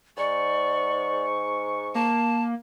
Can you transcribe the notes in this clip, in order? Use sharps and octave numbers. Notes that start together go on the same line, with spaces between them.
G#2 D5 C#6
A#3 A5